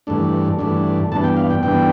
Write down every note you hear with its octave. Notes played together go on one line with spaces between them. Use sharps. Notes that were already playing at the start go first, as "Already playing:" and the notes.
G2 E3 A3 D4
G2 E3 A3 D4
G2 E3 B3 D4 A5
G5
F5
G5
G2 E3 B3 D4 G5